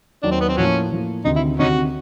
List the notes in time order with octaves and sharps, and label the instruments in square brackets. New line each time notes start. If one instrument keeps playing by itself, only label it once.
[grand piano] D#2 D#3 F#3 [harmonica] D4
[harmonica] C4
B3
C4
[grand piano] A2 F3 A#3 [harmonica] F#3 C#4
[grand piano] A2 F3 A#3
[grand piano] D2 C3 D#3 [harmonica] D#4
[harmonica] E4
[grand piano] D2 C3 D#3 [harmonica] C#4 D#4 F#4